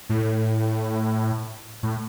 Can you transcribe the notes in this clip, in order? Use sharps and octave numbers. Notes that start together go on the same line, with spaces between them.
A2
A2